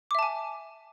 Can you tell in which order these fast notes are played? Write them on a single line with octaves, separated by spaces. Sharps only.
D6 E5 A5 G#5